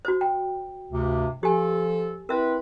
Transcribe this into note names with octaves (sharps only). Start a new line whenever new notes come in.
F#4 C5
G5
D2 G2 C3
F3 G4 A4 G#5
C4 E4 A#4 B4 E5